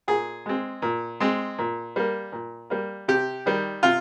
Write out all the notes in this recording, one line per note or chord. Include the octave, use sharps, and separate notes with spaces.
A#2 G#4
G#3 C4
A#2
G#3 C4
A#2
G3 A#3
A#2
G3 A#3
C3 G4
D#3 G3
C3 F4